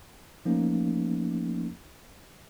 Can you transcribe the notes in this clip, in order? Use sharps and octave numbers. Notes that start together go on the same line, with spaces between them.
F3 A3 A#3 C#4 D#4